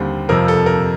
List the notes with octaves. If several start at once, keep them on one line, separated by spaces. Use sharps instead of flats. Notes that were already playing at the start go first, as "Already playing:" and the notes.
Already playing: D#2 D3 G3 C4
F2 C3 F3 A#4
A4
A#4